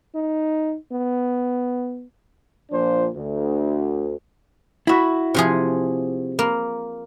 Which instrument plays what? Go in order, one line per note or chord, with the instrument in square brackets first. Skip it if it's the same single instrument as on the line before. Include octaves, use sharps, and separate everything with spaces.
[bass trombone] D#4
B3
[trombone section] A#2 F3 D4 C5
D2
[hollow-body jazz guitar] E4 F#4 [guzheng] E5 B5
[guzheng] C3 F3 G#4
A#3